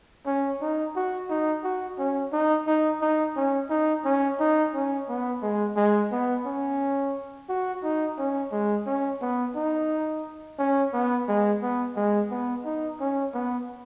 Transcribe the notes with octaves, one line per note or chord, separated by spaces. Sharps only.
C#4
D#4
F#4
D#4
F#4
C#4
D#4
D#4
D#4
C#4
D#4
C#4
D#4
C#4
B3
G#3
G#3
B3
C#4
F#4
D#4
C#4
G#3
C#4
B3
D#4
C#4
B3
G#3
B3
G#3
B3
D#4
C#4
B3